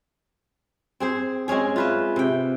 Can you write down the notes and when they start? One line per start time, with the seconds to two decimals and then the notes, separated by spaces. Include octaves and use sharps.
1.00 C4 G#4 C5
1.48 G#3 C4 C#4 G#4
1.76 F4 B4 E5
2.16 C3 G5